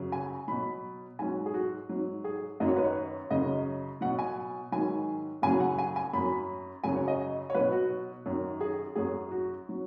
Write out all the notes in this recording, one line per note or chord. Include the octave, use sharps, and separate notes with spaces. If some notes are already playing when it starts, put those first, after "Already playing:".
Already playing: F#2 C#3 F#3
G#5
B2 F#3 B5
G#2 F#3 G#5
G#4
F#4
G#2 F#3
G#4
F#2 D#3 F#3 D#5
C#5
B4
C#5
F#2 C#3 F#3 D#5
B2 F#3 F#5
G#5
G#2 D#3 F#3 G#5
F#2 C#3 F#3 G#5
F#5
G#5
G#5
F#2 F#3 B5
F#2 C#3 F#3 G#5
C#5
D#5
C#5
B2 F#3 B4
F#4
F#2 D#3 F#3
G#4
F#2 F#3 G#4
F#4
F#3